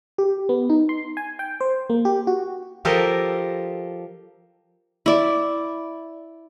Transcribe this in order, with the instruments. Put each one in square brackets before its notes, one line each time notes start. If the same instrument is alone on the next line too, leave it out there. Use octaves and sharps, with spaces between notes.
[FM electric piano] G4
B3
D#4
C6
G#5
G5
C5
A#3
G4
F#4
[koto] F3 G4 A4 A#4 D#5
[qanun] E4 D5